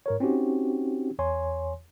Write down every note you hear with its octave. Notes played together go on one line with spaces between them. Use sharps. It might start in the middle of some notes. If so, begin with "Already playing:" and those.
G#2 A#4 C#5
C4 C#4 D#4 F#4 G4
E2 C#5 G#5 C6